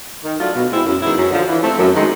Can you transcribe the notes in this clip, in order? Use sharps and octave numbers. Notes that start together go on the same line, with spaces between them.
D#3
F#3 A3 D4 F4
B2
G#3 C4 E4
F#2
D#3 G#3 B3 E4
F#2
D3 F3
E3
A3 C4
F#2
D#3 G#3